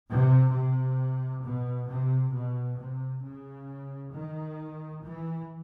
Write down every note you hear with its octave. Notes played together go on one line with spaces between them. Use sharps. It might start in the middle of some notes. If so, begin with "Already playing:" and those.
C3
C3
B2
C3
B2
C3
C#3
D#3
E3